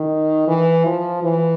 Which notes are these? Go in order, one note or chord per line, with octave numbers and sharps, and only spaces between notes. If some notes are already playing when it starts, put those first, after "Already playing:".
Already playing: D#3
E3
F3
E3